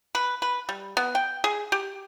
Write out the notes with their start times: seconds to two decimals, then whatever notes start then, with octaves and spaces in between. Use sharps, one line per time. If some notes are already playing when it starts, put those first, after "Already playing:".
0.15 B4
0.42 B4
0.69 G3
0.97 B3
1.15 G5
1.44 G#4
1.72 G4